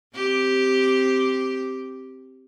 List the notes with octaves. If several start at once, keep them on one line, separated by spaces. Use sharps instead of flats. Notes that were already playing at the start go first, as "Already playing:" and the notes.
C4 G4